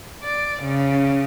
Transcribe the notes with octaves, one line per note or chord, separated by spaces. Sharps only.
D5
C#3